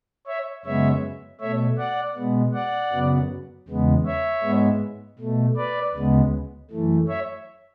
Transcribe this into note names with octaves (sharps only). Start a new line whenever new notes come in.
C#5 E5
F#2 C#3 G#3 B3 C#5 E5
B2 A3 C#5 E5
D5 F#5
B2 G#3 B3
D5 F#5
F#2 C#3 F#3 B3
E2 C#3 G#3 B3
C#5 E5
G#2 G#3 B3
B2 A3
B4 D5
D2 C#3 G#3 B3
F#2 E3 A3
C#5 E5